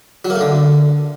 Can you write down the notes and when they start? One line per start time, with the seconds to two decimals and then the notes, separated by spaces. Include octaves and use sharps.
0.25 F#3
0.30 A#3
0.36 A3
0.41 D3